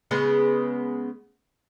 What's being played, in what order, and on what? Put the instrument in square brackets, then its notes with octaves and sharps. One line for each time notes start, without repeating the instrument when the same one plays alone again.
[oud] C#3 G#3 B3